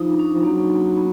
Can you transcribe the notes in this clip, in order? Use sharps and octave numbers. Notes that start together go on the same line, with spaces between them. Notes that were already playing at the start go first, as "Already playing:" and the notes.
Already playing: F3 D#4
D4
C#4
F3
F#3 A#3
B3